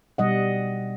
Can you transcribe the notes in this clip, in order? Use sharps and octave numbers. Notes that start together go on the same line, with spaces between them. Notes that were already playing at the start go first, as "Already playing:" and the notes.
B2 G3 D#5 F#5